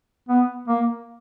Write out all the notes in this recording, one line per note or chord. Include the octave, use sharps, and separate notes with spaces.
B3
A#3